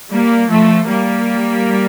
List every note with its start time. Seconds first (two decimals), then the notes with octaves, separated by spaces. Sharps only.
0.11 G3 A#3
0.50 F3 A3
0.88 G3 A#3